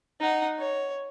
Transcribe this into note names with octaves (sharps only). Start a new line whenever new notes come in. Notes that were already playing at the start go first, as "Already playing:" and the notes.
D#4 F#5
C#5